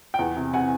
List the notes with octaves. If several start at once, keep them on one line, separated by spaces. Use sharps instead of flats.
G5
E2 F#5
C3
C3 F#5 G#5